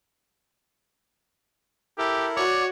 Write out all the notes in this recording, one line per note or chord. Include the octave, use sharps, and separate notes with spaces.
E4 G4 A4 A#4
F#4 C#5 D5